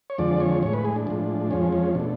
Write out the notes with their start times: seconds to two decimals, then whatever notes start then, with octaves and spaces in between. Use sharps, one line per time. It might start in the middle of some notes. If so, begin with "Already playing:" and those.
0.10 C#5
0.18 F2 D3 F3 G#3 D5
0.40 C#5
0.62 A2 G#3 C#5
0.73 B4
0.85 G#4
0.96 D4
1.07 A2 F3 G#3
1.51 F2 F3 G#3 C#4
1.73 C#4
1.95 B2 A3 D4